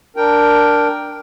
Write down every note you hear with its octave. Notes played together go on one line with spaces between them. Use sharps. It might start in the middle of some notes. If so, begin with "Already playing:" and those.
D4 A#4 G5